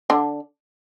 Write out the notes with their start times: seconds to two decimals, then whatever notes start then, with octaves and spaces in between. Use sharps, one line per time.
0.10 D3 D4